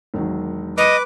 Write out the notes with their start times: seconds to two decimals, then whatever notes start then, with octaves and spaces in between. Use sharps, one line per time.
0.14 E1 D#3 F#3
0.78 B4 D#5 D6